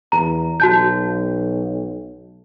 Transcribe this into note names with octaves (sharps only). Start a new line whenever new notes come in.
E2 A#5
B1 F#4 A5 G6